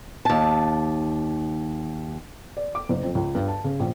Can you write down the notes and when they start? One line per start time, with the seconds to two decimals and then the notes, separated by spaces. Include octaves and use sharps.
0.25 D#2 A5
2.57 D5
2.75 D6
2.89 F#1
3.03 F2
3.15 C#2
3.35 G2
3.48 A5
3.64 C#3
3.80 A#1